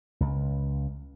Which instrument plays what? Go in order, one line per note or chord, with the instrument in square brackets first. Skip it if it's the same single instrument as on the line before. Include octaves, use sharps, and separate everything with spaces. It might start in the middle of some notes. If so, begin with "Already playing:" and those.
[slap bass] C#2